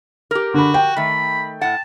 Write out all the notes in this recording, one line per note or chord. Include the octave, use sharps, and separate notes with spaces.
G4 A#4
D3 F#4 B5
G5
D#3 A3 B5
A2 F#5 A5